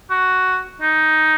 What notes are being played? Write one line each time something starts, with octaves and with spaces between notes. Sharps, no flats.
F#4
D#4